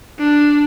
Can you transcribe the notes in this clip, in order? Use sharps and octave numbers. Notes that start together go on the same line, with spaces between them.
D4